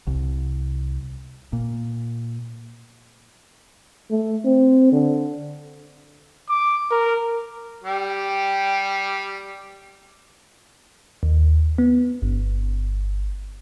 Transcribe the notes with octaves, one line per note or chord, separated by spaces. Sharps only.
C2
A#2
A3
C4
D3
D6
A#4
G3 G4
D#2
B3
G1